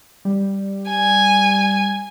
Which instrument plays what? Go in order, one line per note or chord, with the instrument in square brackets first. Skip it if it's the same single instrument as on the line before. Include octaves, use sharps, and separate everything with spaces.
[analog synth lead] G3
[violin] G#5